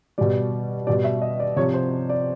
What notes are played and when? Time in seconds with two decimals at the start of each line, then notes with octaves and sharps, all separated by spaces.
0.18 B2 G3 D5
0.87 B2 G3 D5
1.04 E5
1.22 D#5
1.40 D5
1.57 C3 F3 C#5
1.74 C5
2.09 D5